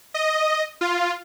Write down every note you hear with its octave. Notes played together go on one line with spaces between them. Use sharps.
D#5
F4